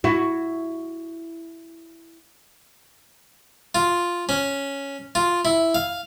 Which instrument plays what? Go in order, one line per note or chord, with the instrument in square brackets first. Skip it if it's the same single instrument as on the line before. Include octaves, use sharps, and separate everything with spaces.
[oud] E4 F#4
[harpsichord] F4
C#4
F4
E4
F5